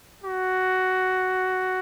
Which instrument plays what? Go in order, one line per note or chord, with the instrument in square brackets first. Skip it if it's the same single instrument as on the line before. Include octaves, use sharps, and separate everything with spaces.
[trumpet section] F#4